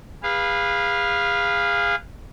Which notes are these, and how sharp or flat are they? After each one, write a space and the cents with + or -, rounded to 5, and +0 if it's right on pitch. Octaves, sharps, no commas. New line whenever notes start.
G#4 -30 B4 -10 F5 +0